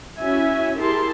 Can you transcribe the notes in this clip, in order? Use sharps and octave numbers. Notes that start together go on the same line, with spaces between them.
C#4 E4 F#4 E5 G#5
E4 G4 G#4 A#4 A5 C6